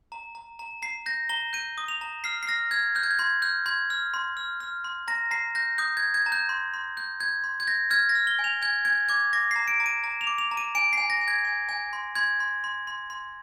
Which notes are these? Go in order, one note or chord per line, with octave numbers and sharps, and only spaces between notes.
A#5
A#5
A#5
A#5 C7
G6 A#6
A#5 G7
G6 D#7
D#6
F7
A#5
F6 C7
C7
F6 A#6
F6 G#6
F6 G6
G#6
G6
C6 G#6
F6 G6
C6 G#6
F6
C6
F6
F6
C6
A#5 A#6
A#5 C7
G6 A#6
D#6 G6
G#6
G6
G#6
A#5
G6
C6
C6
G6
G6 G#6
C6
G#6
G6 A#6
F6 G#6
A#6
F6
G7
G#5
F7
G#5 G#6
G#5 G#6
D6 G#6
D6 A#6
C7
A#5
D7
A#5
D#7
A#5
F7
D6
F7
A#5
D#7
G#5 D7
C7
G#5
A#6
G#5
G#6
G#5
G#5
C6
C6 G#6
C6
C6
C6
C6